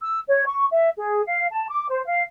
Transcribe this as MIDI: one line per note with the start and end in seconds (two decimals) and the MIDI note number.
0.02 0.19 88
0.28 0.44 73
0.46 0.64 85
0.71 0.90 76
0.97 1.22 68
1.26 1.46 77
1.52 1.65 81
1.68 1.85 86
1.89 2.01 72
2.05 2.22 77